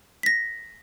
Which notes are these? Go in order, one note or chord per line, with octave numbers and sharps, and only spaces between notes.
A#6 B6